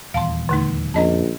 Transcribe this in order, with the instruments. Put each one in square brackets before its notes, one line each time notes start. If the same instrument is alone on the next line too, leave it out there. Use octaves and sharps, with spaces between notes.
[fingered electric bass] D#1 E2 [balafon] F5 A5 C6
[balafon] D3 A3 D#4
[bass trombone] A#1 [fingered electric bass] F2 [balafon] C#4 D#5 A5